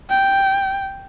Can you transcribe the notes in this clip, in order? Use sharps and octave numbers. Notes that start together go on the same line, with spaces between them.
G5